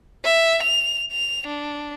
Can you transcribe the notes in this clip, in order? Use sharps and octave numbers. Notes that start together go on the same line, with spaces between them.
E5
F7
F7
D4